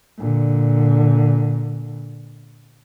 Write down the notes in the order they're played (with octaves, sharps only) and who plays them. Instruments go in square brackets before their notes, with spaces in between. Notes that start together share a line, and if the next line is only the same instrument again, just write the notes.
[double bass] A#2 D3